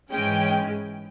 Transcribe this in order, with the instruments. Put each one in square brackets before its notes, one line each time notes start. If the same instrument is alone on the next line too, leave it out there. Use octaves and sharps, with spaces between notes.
[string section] G#2 E3 G#3 C#4 G5